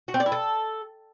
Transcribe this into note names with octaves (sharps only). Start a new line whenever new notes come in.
F#4
C4
D5
E4
A4